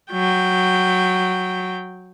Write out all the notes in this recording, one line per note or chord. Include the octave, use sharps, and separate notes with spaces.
F#3 G5